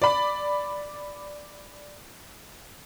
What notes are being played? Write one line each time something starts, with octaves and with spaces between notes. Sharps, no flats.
D5 B5